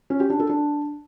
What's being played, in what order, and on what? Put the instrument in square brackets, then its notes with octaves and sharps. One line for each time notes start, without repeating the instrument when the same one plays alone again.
[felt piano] C#4
G4
D4
A4
D4